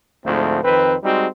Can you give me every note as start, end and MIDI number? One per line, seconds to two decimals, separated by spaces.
0.25 0.60 38
0.25 0.60 44
0.25 0.60 53
0.25 0.60 57
0.25 0.60 60
0.63 0.95 41
0.63 0.95 51
0.63 0.95 60
0.63 0.95 71
1.03 1.27 55
1.03 1.27 56
1.03 1.27 60
1.03 1.27 63
1.03 1.27 66